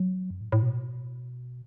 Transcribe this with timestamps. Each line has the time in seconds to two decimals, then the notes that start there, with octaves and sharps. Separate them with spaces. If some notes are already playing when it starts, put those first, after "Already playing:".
Already playing: F#3
0.30 F#2
0.41 A2
0.52 A2
0.62 B2